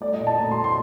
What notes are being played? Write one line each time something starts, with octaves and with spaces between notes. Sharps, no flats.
A3 D5
D#5
A#2
A5
A3 A#5
C6
A#2
C6